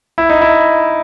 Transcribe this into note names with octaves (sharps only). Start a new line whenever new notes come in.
E4
D#4
E4